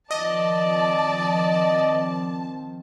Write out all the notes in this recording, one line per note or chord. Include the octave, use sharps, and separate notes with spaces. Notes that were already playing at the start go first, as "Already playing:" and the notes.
D#3 F3 C4 D5 D#5 A5